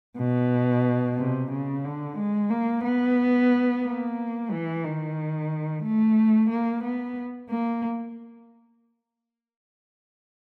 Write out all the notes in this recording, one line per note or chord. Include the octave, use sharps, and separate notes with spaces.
B2
C3
C#3
D3
G#3
A#3
B3
A#3
E3
D#3
A3
A#3
B3
A#3